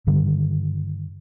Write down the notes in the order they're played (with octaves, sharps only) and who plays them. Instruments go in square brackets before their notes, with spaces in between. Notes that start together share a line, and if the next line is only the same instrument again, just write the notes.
[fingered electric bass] G2 D3 D#3 G3